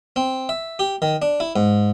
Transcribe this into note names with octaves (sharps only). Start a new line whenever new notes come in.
C4
E5
G4
D#3
D4
E4
G#2